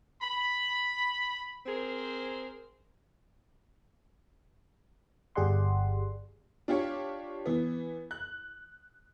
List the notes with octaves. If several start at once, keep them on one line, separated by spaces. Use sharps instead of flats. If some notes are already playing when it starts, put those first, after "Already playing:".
B5
C4 G#4 A#4 C5
G1 G4 G#4 D5 F#5 C6
D4 F4 G4 C#5
E3 B3
F#6